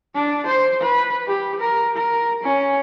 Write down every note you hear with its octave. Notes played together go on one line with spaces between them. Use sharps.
D4
C5
B4
G4
A#4
A#4
C#4